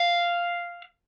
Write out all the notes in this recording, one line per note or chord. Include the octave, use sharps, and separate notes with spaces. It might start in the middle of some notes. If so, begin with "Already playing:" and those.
Already playing: F5